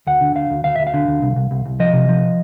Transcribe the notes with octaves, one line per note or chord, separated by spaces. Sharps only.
D2 F#5
D3
D2 F5
D2
D2 F5
D2 E5
F5
D3
D2
C2
C2
C2
C2
F3 D#5
C3
F3